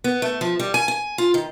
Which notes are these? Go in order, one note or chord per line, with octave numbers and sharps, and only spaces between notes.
B3
A3
F3
G3
G#5
G#5
F4
D#3